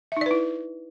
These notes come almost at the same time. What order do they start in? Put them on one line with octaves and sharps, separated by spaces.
E5 D#4 D5 B4 E4